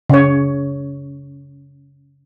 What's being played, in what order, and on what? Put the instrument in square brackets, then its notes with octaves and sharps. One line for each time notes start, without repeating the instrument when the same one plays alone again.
[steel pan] C#3 C#5